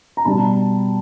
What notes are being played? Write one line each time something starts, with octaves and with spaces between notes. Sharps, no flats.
A#5
B2 G3 A5 B5